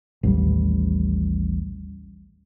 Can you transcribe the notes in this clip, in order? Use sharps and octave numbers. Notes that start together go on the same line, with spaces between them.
A1 D#2 G3